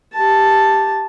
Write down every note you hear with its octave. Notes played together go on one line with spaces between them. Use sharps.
G4 A5